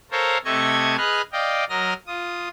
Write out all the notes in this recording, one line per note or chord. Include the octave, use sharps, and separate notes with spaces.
A4 A#4 C5 C#5 F5 A#5
C3 A3 A4 D#5 C#6 G#6
G#4 B4 D#5 F6 F#6
D5 D#5 F5 G5
F#3 A#4 D#5 F6 A#6
F4 D#6